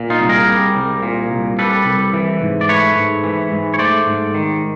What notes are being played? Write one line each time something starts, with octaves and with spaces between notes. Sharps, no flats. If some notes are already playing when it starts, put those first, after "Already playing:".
Already playing: A#2
D#4 F4
C2
G#4 A#4
G3
C2
A#2
C2
G3 A4 B4
C2
E3
G#2
D5
A3 B4 C#5
G#2
E3
G#2
C#5
A3 C5 D5
G#2
D#3